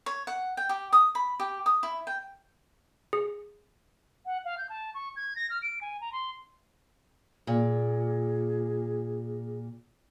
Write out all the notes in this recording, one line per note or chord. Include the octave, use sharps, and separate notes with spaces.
C#5
F#5
G5
G4
D#6
B5
G4
D#6
E4
G5
G#4
F#5
F5
G6
A5
C#6
G#6
A#6
F6
D7
G#5
A#5
C6
A#2 G#4